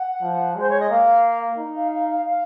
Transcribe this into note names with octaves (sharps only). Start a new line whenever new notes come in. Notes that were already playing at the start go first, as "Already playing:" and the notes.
Already playing: F#5
F3
G#3 C5
C#5
D#5
A#3 F5
D#4
F5
F5
F5
F5